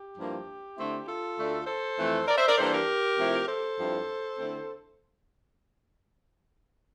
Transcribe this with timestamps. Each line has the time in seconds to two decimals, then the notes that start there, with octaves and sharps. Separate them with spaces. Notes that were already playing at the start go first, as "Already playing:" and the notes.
Already playing: G4
0.17 G2 F3 A#3 E4
0.77 D3 A3 C4 E4
1.07 F4 A4
1.37 D2 D3 A3
1.67 A4 C5
1.98 F2 E3 A3
2.28 A#4 D5
2.37 C5 E5
2.47 A#4 D5
2.57 G2 E3 G3 A#3 D4 A4 C5
2.73 G4 A#4
3.18 C3 F3 A3 E4
3.47 A4 C5
3.78 G2 F3 C4 E4
4.37 D3 A3 C4 E4